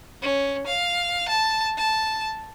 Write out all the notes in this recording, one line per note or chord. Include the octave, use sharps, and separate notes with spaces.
C#4
F5
A5
A5